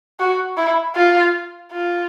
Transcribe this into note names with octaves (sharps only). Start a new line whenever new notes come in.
F#4
E4
F4
F4